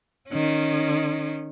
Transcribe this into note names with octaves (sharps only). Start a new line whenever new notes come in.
D#3 C#4